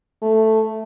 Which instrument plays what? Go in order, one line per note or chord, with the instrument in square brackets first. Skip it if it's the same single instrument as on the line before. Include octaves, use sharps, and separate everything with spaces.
[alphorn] A3